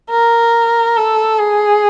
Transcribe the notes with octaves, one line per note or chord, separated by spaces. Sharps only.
A#4
A4
G#4